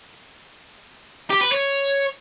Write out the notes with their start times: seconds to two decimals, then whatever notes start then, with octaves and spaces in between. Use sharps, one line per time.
1.30 G4
1.41 B4
1.52 C#5